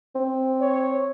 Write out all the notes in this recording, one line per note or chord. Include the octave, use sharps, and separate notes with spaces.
C4
C#5